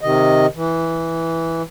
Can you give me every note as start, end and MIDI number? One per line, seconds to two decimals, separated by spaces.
0.01 0.46 48
0.01 0.46 51
0.01 0.46 75
0.55 1.62 52